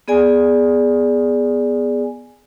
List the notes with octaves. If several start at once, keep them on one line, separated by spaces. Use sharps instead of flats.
B3 G#4 D5 G#5